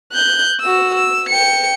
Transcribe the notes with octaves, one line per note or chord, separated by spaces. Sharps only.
F#6 G6
F#4 E6
E6
G5 C#7